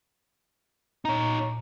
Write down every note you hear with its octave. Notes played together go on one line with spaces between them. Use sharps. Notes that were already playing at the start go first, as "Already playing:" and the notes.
A#2 D#4 C#5 A#5